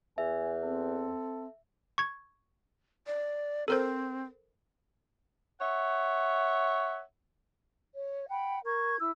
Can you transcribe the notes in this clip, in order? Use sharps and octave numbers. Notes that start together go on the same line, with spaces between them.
E2 E5 G#5
C4 A4
C#6 G#6
D5
C4 A4 A#4 C5
C#5 E5 F#5
C#5
F#5 G5 B5
A#4 C#6 G#6
E4 E6